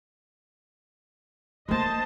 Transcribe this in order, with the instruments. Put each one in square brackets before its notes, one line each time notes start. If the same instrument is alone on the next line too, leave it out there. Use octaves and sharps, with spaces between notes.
[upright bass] A3 A#3 [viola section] C5 D#5 A5